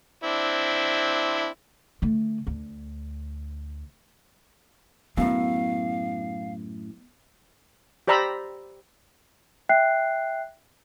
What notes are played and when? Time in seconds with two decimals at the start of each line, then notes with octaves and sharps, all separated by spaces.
0.24 C4 D4 E4
2.02 D3 A3
2.47 D2
5.17 F#2 A2 B3 F5
8.08 G4 C5 D5 A#5 B5 E6
9.69 E5 G5 F#6 C7